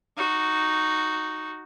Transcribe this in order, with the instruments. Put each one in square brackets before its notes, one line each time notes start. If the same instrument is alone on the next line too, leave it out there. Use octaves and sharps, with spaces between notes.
[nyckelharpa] D#4 F#4